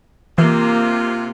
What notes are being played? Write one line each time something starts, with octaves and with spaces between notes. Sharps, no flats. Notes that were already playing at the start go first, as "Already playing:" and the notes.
C3 E3 A#3 F4